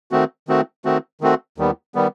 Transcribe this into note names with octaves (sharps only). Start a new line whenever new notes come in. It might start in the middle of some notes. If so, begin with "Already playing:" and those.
D#3 A3 C4 F#4
D#3 A3 C4 F#4
D#3 A3 C4 F#4
D#3 A3 C4 F#4
D#2 D#3 G3 B3
D#3 G3 B3